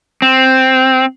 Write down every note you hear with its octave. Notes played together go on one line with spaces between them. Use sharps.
C4